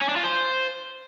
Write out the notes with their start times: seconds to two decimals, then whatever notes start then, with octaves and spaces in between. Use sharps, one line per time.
0.01 C#4
0.09 D4
0.16 F4
0.24 C5